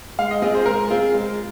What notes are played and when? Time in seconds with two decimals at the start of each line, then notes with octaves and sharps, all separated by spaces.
0.18 G#3 F5
0.31 D#5
0.42 C4 F4 G#4 D#5
0.55 C5
0.65 G#3 A#4
0.90 C4 F4 G#4
1.14 G#3